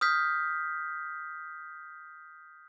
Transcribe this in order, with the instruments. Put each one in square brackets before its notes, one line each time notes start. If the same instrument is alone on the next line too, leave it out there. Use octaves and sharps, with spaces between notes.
[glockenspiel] D#6 F6 G6 B6